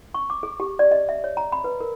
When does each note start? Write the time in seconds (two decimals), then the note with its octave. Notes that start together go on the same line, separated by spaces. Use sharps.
0.14 C#6
0.30 D6
0.43 G#4
0.60 G4
0.79 D5
0.91 D#5
1.09 E5
1.24 C#5
1.37 A#5
1.52 B5
1.64 B4
1.81 A#4